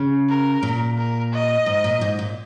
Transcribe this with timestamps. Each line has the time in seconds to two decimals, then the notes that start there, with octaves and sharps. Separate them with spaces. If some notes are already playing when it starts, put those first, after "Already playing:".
Already playing: C#3
0.29 A#4
0.63 A#2
0.97 A#4
1.33 D#5
1.66 G#2
1.84 A#2
2.01 G#2
2.19 A#2